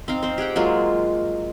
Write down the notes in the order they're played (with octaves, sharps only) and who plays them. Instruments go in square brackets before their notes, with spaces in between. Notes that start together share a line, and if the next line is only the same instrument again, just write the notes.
[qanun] C4 D#4 F5
C4 C5
G4 G#4 F#5 G5
F#3 G#3 A#3 F4